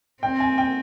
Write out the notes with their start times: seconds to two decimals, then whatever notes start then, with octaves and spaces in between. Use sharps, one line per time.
0.23 C4 G5
0.40 G#5
0.58 G5